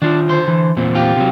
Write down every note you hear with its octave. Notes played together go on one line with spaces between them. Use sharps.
D#3 D4 F4
D3 C5
E3
E2 A#2 C4
F4 G4
C3 F#3